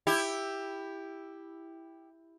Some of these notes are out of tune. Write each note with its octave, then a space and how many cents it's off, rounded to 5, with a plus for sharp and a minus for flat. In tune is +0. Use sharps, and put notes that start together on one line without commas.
E4 +0 G4 +10